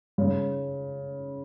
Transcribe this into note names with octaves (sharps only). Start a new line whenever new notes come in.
C#3